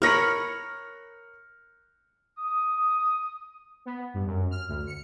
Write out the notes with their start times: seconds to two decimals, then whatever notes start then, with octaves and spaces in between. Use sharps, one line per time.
0.02 A#4 C#5 B5 F6 A#6 C#7
2.38 D#6
3.86 B3
4.14 G2
4.27 F#2
4.51 F6
4.69 D2
4.87 C#7